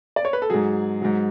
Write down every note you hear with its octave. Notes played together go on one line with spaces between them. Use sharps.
D5
C#5
B4
A4
G#2 F#3 G#4
G#2 F#3